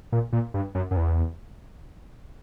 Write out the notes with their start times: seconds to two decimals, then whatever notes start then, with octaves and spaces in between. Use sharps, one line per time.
0.12 A#2
0.33 A#2
0.54 G2
0.75 F#2
0.91 F#2
0.97 E2